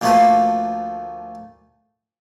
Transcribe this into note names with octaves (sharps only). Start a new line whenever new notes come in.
D2 F3 A3 A#3 F4 B4